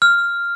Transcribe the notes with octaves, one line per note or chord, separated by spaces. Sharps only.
F6